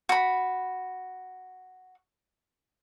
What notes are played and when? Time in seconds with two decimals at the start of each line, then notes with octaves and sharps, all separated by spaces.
0.09 F#4 B5